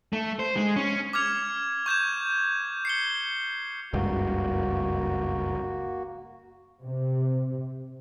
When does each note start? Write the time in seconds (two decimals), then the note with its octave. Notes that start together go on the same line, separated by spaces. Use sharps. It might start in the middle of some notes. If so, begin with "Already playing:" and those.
0.13 A3
0.39 C5
0.56 G#3
0.76 C#4
1.13 D6 F6 G#6 F7
1.86 C#6 G6 G#6 E7
2.85 C7 C#7 G7
3.93 F#1 C#2 G2 A#3 F#4
6.83 C3